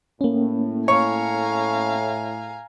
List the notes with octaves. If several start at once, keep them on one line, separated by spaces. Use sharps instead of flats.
A2 A#3 C#4
C#5 F5 G#5 A#5